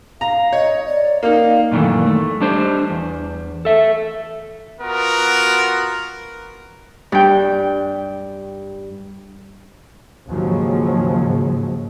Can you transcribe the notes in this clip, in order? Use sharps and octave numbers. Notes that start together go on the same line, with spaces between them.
F5 A#5
C#5 D#5
D5
A#3 D#4 F5
F#2 A#2 D#3 E3 A3
A3
G3 D4 C5
E2
A4 E5
B3 F4 F#4 A#4
G2 G5
D#2 G#2 C#3 F3 F#3